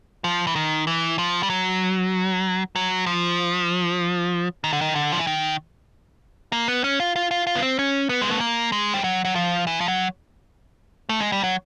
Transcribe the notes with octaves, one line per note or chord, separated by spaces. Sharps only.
F3
E3
D#3
E3
F3
G3
F#3
F#3
F3
D#3
D3
D#3
D3
F3
E3
D#3
A#3
B3
C#4
F4
F4
F4
F4
B3
C4
C#4
B3
G#3
A3
A#3
G#3
G3
F#3
F#3
F3
E3
F3
F#3
A3
G#3
G3
F#3